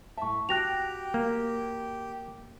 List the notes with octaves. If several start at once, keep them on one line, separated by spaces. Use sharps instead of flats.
A2 E5 A5 C#6
F#4 G4 G5 F#6 A#6 F7
A#3